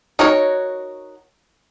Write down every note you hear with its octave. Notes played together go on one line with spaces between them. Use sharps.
D#4 F#4 A#4 C#5